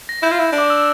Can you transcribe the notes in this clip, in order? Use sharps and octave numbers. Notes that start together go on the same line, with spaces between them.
A#6
E4 G6
F4
E4
D4
D6
E6